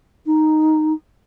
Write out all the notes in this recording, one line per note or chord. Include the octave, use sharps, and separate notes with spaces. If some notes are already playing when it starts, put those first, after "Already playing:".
D#4